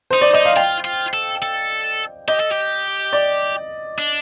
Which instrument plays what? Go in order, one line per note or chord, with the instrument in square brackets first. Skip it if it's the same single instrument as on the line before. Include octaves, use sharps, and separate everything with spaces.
[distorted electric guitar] D#4 [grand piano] C5
[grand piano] D5
[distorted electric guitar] D#4 [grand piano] D#5
[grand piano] F5
[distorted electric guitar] F4 [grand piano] G5
[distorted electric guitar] F4
A4
A4
[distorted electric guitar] G4 [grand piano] D#5
[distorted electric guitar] A4
G4
[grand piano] D5
[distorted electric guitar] D4